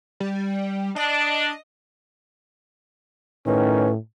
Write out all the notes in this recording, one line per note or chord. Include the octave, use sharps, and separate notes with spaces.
G3
D4 D#5
A2 D#3 C#4 B4